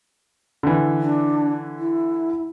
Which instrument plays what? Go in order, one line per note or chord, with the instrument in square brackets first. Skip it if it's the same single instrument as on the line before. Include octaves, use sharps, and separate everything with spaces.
[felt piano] D3 E3
[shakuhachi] D4
E4